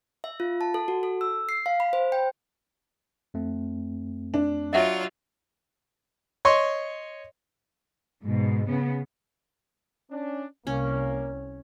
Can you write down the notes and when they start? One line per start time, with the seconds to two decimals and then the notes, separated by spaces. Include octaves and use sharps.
0.24 E5
0.40 F4
0.61 A5
0.74 A4
0.88 F#4
1.03 A4
1.21 E6
1.49 C7
1.66 F5
1.80 B5
1.93 C5
2.12 G5
3.34 F2 A3 C4
4.34 D4
4.73 F#3 F4 D#5 E5 F#5
6.45 C#5 D#5 C6 C#6
8.22 G#2 B2
8.67 C#3 B3
10.11 C#4 D4
10.67 C2 A#3 C#4